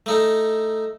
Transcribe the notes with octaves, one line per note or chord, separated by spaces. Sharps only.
A3 D#4 A4